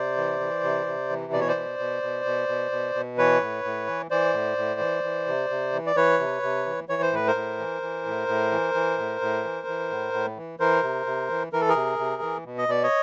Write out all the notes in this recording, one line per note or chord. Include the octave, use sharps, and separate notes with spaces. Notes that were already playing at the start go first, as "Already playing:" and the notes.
Already playing: C3 C5 D5
E3
E3
C3
C3
E3
B2 D5
C#5
C5 D5
B2
B2
B2
B2
B2
B2
B2
E3 B4 C#5
A2
A2
E3
E3 C5 D5
A2
A2
E3
E3
C3
C3
E3
D5
E3 B4 C#5
C3
C3
E3
E3 C#5
C5
A2 B4
A#4 C5
A2
E3
E3
A2
A2
E3
E3
A2
A2
E3
E3
A2
A2
E3
E3 A#4 C5
C3
C3
E3
E3 A#4
A4
G#4 A#4
C3
C3
E3
B2
D#5
B2 D5
C#5 D#5